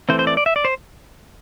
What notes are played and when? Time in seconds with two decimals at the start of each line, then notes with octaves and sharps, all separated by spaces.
0.09 E3 A3 C4 C5
0.19 C5
0.27 D5
0.37 D5
0.46 E5
0.56 D5
0.65 C5